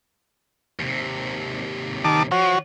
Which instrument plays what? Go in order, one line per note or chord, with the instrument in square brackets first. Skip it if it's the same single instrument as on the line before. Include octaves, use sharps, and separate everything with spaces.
[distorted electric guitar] D#2 C3
[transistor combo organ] D#3 A5 D6
[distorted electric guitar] F3 [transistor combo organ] F#4 C#5